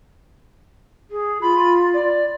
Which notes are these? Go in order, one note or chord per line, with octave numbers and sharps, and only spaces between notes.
G#4
F4 B5
D5